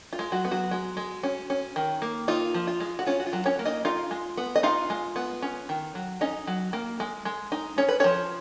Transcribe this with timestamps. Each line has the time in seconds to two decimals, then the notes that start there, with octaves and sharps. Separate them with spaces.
0.13 F4
0.19 G#3
0.32 F#3 F#4
0.45 B3
0.51 F#3 F#4
0.71 G#3
0.97 G#3
1.23 C#4
1.50 C#4
1.76 D#3
2.02 A#3
2.28 D#4 F4
2.54 F3
2.67 F4
2.80 G#3
2.99 F#4
3.06 C#4 F4
3.20 F#4
3.26 F4
3.33 F#3
3.46 C#4 C#5
3.59 A#3
3.65 D#4 D#5
3.85 D#4 F4 F5
4.11 G#3
4.37 B3
4.56 D#5
4.63 D#4 F4 F5
4.90 G#3
5.16 B3
5.42 C#4
5.69 D#3
5.95 F#3
6.21 C#4 D#4 D#5
6.47 F#3
6.73 A#3
7.00 G#3
7.25 G#3
7.52 D#4
7.78 C#4 C#5
7.89 B4
8.00 F3 C#4 C#5